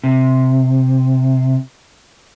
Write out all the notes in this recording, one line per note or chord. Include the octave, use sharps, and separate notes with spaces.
C3